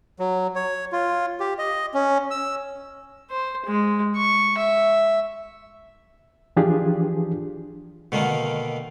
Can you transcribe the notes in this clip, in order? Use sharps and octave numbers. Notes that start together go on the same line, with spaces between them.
F#3
C#5
F4
G4
D#5
C#4
E6
C5
G#3
C#6
E5
E3 F3 D4 F4 G4 G#4
B2 D3 D#3 A#3